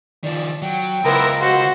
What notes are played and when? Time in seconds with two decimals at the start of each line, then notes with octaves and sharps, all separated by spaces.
0.24 D#3 F3 D5
0.62 F#3 G5
1.05 C#2 B3 E4 A#4 C5
1.41 F#4 C5 F#5